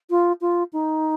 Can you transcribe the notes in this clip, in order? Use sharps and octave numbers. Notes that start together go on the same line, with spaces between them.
F4
F4
D#4